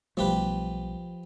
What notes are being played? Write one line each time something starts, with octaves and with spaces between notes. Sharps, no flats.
B1 F3 G3 A3 G4 B4